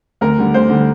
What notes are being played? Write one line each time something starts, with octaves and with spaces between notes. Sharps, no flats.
D2 A#4
D3 G3
D2 C5
D3 G3